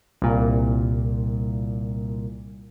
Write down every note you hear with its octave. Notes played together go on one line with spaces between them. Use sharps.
C2 A#2